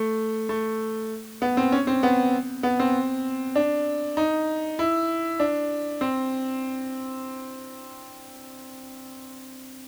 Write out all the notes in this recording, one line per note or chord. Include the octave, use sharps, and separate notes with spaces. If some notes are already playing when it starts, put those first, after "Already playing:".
Already playing: A3
A3
B3
C4
C#4
C4
B3
B3
C4
D4
D#4
E4
D4
C4